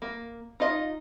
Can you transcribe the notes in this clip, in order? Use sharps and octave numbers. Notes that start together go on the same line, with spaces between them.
A#3
D#4 F4 D#5